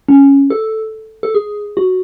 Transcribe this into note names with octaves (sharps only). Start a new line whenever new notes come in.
C#4
A4
A4
G#4
F#4